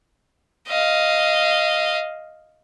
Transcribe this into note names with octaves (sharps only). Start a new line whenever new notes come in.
D#5 F5